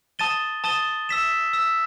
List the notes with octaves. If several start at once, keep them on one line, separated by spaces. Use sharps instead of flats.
A5 D#6 A6 D#7 G7
A5 D#6 A6 D#7 G7
E6 B6 E7
E6 B6 E7